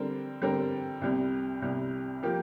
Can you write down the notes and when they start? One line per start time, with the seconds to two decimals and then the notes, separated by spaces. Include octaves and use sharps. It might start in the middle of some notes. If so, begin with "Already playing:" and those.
Already playing: D3 G3 C4 A#4
0.42 D3 G3 C4 A#4
1.01 C2 C3 G3
1.61 C2 C3 G3
2.23 F3 A#3 G4 A#4